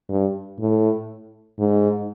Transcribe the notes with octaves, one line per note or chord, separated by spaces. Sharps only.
G2
A2
G#2